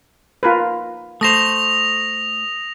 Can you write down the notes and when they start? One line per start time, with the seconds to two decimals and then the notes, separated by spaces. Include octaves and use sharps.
0.43 F4 A#4 B4
1.21 A3 C5 D#6 A#6 F7